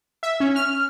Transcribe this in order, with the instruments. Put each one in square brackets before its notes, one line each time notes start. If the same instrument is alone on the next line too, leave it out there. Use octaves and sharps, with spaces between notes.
[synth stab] E5
C#4
F6